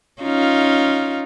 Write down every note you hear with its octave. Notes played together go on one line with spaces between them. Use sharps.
C#4 D#4 F4